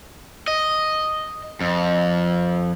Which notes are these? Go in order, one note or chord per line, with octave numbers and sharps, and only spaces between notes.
D#5
F2